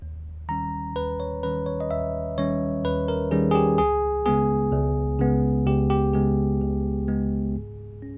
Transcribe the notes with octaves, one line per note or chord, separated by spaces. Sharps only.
D#2
D#3 G3 C#4 A#5
D#2 B4
C#5
D#3 G3 C#4 B4
C#5
D#5
D#2 E5
D#3 G3 C#4 C#5
D#2 B4
A#4
D#3 G3 C#4 G#4
G#4
G4
C#2 G#4
C#3 G#3 B3 G#4
C#2
C#3 G#3 B3
C#2 G4
G4
C#3 G#3 B3 G#4
C#2
C#3 G#3 B3
G#2
C#4